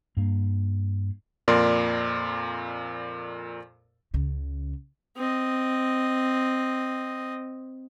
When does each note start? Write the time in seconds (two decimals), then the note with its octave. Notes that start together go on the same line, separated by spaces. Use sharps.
0.17 G2 A#3
1.48 F2 A#2 A#4 D5 C6
4.14 C#2 C#3
5.17 C4 D#5